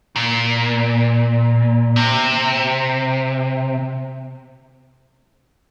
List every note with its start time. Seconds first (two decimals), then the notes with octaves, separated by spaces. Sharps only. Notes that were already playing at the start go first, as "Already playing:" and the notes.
0.16 A#2
1.96 C3